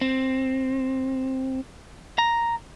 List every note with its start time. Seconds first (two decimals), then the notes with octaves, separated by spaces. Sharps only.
0.01 C4
2.18 A#5